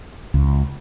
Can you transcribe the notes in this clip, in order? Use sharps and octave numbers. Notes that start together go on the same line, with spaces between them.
C#2